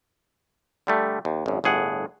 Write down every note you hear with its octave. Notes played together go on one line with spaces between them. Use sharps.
D3 G3 A3
D#2
G#1 F#2
G1 A2 G#4 F#5